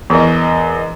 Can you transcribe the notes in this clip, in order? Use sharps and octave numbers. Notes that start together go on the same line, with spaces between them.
E2 E3 A#4 D#5